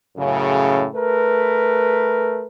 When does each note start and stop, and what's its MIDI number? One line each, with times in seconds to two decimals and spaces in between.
0.17 0.86 42
0.17 0.86 45
0.17 0.86 49
0.95 2.47 57
0.95 2.47 70
0.95 2.47 71